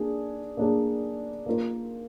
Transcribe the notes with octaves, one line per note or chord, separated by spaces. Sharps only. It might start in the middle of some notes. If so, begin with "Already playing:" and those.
Already playing: A#3 D4 G#4
A#3 D4 G#4
A#3 F4 A#4